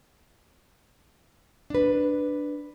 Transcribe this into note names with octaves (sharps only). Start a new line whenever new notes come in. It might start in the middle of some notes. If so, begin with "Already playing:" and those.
D4 B4